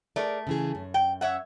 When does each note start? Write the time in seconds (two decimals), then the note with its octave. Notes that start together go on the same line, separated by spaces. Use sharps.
0.16 A3 G#4 A#4 D5
0.47 C#3 E3 G#4
0.75 F#2
0.94 G5
1.21 C#5 E5 F#5